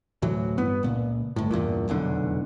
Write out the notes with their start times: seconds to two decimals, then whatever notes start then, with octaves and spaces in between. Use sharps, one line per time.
0.22 D2 A2 E3 F#3
0.57 G2 B3
0.83 C#2 A#2
1.36 G1 A2
1.51 E2 G2 A#2
1.88 F1 B1 E2 D3